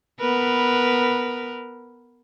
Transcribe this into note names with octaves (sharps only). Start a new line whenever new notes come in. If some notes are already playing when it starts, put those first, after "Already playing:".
B3 A#4 B4